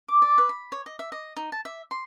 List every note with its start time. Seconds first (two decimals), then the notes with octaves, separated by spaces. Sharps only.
0.08 D6
0.22 D5
0.38 B4
0.49 B5
0.72 C#5
0.86 D#5
0.99 E5
1.12 D#5
1.37 D#4
1.52 A5
1.65 E5
1.91 C6